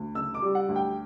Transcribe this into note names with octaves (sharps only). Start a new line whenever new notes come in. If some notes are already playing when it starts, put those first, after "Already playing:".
Already playing: D2
C#3 E6
D6
G3
F#5
D2
G5